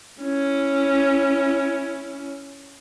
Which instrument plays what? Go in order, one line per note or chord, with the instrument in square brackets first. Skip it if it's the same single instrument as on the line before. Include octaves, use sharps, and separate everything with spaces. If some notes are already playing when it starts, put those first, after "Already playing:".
[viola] C#4 E4